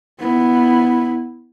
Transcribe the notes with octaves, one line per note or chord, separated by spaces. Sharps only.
B3 E4